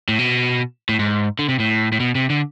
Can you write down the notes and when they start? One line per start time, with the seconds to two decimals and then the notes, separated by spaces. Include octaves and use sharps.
0.09 A2
0.19 B2
0.89 A2
0.99 G#2
1.39 D3
1.48 C3
1.60 A2
1.92 A2
2.00 B2
2.15 C3
2.30 D3